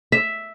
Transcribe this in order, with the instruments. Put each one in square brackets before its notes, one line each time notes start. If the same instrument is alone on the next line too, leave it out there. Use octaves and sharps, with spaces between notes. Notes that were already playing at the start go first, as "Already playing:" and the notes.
[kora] E5